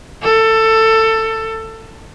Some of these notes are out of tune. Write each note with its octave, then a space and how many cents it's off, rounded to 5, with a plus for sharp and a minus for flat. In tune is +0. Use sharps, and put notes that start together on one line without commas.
A4 +20